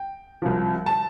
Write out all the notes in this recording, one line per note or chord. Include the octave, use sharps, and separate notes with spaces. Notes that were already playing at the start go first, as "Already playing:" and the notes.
Already playing: G5
C2 C3 F3
A5